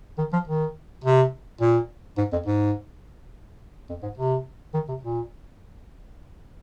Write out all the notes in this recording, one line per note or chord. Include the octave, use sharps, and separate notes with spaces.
D#3
F3
D#3
C3
A#2
G#2
F2
G#2
F2
G#2
C3
D#3
C3
A#2